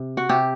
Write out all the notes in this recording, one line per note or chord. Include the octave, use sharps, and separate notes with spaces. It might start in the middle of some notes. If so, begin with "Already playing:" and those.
Already playing: C3
F#4
C3 G4